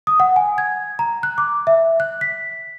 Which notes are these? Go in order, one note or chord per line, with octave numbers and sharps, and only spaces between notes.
D#6
F#5
G#5
G#6
A#5
F#6
D6
E5
F#6
B6